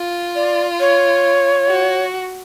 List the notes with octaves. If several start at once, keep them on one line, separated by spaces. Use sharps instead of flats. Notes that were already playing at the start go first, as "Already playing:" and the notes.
Already playing: F4
D5
C#5
F#4